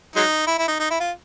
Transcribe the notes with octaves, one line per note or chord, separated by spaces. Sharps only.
F#3 G#3 D#4
E4
E4
D#4
D#4
E4
F4